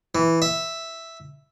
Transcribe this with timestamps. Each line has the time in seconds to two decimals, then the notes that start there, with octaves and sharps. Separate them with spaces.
0.15 E3
0.42 E5